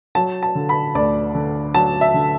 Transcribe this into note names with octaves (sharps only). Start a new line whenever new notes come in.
F#3 A5
A5
D3
B5
D2 D5
D3
F#3 A5
E5
D3